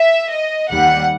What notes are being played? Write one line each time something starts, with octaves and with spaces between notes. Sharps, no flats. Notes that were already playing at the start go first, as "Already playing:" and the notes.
Already playing: E5
D#5
D#2 D#3 G3 F#5